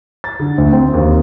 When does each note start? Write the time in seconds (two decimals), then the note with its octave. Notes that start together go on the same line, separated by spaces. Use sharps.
0.24 A6
0.40 D3
0.58 D2
0.72 C4
0.93 D#2